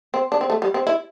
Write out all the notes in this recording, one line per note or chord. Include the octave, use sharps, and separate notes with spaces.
C4
D4
C4
A3
G3
C4
E4